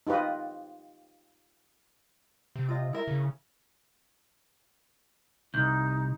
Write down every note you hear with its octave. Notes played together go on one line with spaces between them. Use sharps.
D#4 F4 G4 B4 D#5
C3
F4 D#5
E4 A#4 E5
C#3
C2 D#4 G6